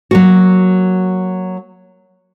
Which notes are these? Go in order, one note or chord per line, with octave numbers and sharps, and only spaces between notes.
F#3 A#3 F#4